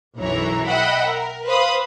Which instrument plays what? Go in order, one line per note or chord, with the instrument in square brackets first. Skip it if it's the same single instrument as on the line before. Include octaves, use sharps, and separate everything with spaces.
[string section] B1 F#2 E3 E4 C#5 A#5
D#5 E5 F#5 G5 B5
A#4
B4 C5 F5 B5 D#6